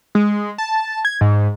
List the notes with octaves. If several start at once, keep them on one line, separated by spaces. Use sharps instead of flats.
G#3
A5
G#6
G#2